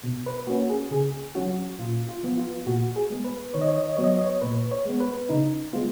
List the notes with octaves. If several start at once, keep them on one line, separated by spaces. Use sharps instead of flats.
B2
B4
A#3 C#4 F#4
G#4
C#3 G#4
F#3 C#4 F#4
A#2 F4
F4
F3 B3
F4
A#2 F#4
G#4
G#3 B3
B4
D#3 C#5
D#5
C#5
D#5
C#5
D#5
F#3 B3 C#5
D#5
C#5
D#5
C#5
A#2 B4
C#5
G#3 B3
B4
C#3 D#4
G#3 B3 F4